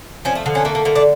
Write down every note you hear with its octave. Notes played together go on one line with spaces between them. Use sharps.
F3 C#4
A3
D3
C#4
A3 A#3
A#3
D3 A#3
D4